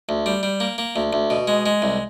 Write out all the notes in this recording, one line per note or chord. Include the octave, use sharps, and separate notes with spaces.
D2
G3
G3
A#3
A#3
D2
D2
B2
G#3
G#3
C2